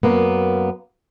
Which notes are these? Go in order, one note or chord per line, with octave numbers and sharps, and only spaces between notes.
F#2 A#3 B3